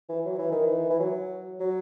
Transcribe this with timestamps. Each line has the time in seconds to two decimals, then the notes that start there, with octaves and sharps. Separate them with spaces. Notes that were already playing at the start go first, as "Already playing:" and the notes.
0.09 E3
0.25 F#3
0.38 E3
0.52 D#3
0.67 E3
0.90 E3
1.00 F#3
1.60 F#3